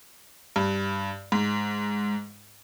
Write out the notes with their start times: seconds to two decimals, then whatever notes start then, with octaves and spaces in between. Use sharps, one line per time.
0.56 G2
1.32 G#2